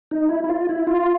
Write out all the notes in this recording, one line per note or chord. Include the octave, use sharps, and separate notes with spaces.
D#4
E4
E4
F4
E4
F4